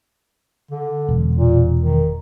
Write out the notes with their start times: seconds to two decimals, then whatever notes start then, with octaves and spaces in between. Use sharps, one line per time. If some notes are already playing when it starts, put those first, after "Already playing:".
0.71 D3
1.09 E1
1.35 A#2
1.80 D#3